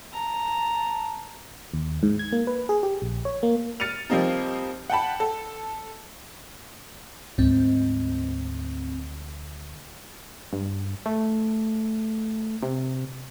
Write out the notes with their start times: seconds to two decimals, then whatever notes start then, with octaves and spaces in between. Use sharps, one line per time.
0.13 A5 A#5
1.74 D#2
2.03 G#2
2.19 G#6
2.32 A#3
2.47 B4
2.69 G#4
2.83 G4
3.02 A#1
3.25 C#5
3.43 A#3
3.80 F6 A6 C#7 D#7 F7
4.10 F3 G3 A#3 C4 D#4
4.90 F#5 G5 A5 B5
5.20 A4
7.38 D2 G#2 C4
10.53 G2
11.06 A3
12.63 C3